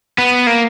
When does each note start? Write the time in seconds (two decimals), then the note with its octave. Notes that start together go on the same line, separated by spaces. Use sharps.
0.18 B3
0.47 A#3